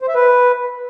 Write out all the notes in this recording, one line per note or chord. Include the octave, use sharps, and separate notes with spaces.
C5
E5
B4